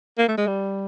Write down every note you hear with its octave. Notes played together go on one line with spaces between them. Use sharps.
A#3
A3
G#3
G3